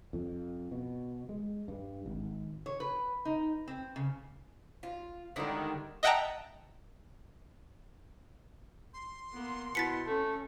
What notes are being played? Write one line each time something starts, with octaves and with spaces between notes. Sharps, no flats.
F2
B2
G#3
G2
G#1
C#5
B4
D#4
C4
C#3
F4
D3 D#3 G3 G#3 D4 E4
D#5 E5 F#5 G5 A5 A#5
C6
A#3 B3
B2 E4 A6 B6 C#7
A3 C#4